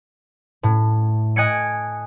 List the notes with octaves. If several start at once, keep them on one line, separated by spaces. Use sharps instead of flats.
A2
D#5 G#5 F#6 G#6 C#7 D7